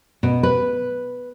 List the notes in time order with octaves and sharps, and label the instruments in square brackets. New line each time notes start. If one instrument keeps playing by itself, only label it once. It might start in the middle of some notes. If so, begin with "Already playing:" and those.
[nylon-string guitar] B2
B4